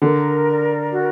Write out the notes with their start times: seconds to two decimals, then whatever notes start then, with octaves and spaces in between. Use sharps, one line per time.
0.02 D3 A#4
0.46 D5
0.90 F#4